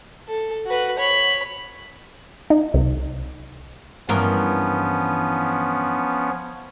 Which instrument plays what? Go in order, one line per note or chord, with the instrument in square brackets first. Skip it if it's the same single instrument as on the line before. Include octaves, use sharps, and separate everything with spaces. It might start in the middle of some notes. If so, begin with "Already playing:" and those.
[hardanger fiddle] A4
F#4 B4
C#5 B5
[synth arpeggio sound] D#4
C2
[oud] G2 E3 A#4 [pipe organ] F3 B3 C#4